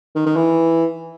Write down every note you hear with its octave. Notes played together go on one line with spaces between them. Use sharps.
D#3
D#3
E3